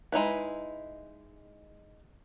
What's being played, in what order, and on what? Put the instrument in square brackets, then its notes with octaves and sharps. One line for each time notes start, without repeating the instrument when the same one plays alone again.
[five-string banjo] G#3 D#4 E4 B4